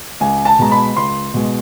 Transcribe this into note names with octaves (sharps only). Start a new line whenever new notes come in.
C#2 G#5
A5
B2 G#3 A#5
B5
C#2 C6
B2 G#3